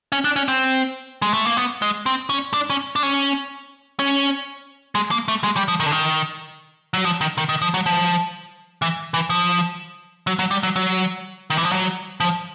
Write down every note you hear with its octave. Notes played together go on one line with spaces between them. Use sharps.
C#4
D4
C#4
C4
G#3
A3
A#3
B3
G#3
C4
C#4
D4
C#4
D4
C#4
C#4
G#3
A#3
A3
G#3
G3
F3
D#3
D3
D#3
F#3
F3
D#3
D#3
D#3
F3
F#3
F3
E3
E3
F3
F#3
F#3
G3
F#3
F#3
D#3
E3
F3
F#3
F3